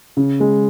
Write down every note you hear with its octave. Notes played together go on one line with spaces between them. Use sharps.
C#3
G#3